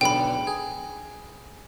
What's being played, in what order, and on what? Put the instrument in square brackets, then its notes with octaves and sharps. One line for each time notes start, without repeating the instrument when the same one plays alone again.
[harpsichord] B1 E2 D3 [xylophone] G5 B5
[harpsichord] G#4